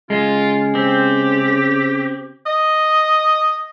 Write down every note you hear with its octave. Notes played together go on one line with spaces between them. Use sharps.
C#3 G#3 F4
C4 G4
D#5